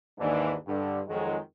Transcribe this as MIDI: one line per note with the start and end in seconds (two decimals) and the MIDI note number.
0.19 0.54 39
0.19 0.54 44
0.19 0.54 52
0.19 0.54 62
0.67 1.00 43
0.67 1.00 50
1.07 1.36 41
1.07 1.36 51
1.07 1.36 54
1.07 1.36 56